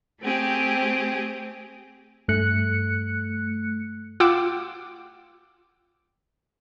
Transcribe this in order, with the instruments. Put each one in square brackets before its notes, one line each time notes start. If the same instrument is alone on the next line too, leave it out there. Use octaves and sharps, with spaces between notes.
[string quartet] A3 C4 G4 G#4
[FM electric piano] G2 A3 F#6 C#7
[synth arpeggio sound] F4 F#5 G5 D6 E6